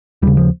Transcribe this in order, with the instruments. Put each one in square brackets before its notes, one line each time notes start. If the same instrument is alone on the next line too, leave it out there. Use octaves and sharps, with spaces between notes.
[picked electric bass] D#2 C#3 G3
F3